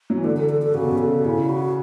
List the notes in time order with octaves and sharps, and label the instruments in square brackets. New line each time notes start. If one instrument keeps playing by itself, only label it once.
[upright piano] F#3
E3
[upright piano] D3 [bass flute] A4
[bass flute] A4
A4
A4
[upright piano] C#3 [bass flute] F#4
[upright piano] B2
C#3
[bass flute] A4
[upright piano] C#3 [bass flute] E4
[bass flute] F#4